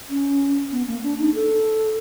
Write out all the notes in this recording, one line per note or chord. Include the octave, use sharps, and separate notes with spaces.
C#4
B3
A#3
D4
D#4
A4